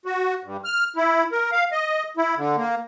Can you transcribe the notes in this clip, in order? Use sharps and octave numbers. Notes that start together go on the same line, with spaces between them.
F#4
G2
F6
E4
A#4
F5
D#5
E4
D3
A#3